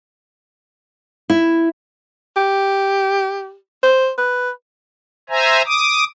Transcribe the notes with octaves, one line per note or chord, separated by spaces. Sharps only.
E4
G4
C5
B4
C5 E5 G#5 A#5
D6 D#6